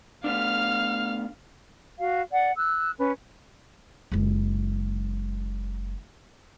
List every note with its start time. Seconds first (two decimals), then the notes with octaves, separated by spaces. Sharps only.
0.24 A3 B3 D4 F5 F6
1.99 F#4 F5
2.31 D5 F#5
2.56 E6 F#6
2.98 C#4 B4
4.12 F#1 G#3